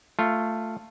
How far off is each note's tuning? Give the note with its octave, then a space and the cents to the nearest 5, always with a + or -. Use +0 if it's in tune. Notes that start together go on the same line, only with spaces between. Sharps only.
A3 +10 F4 +0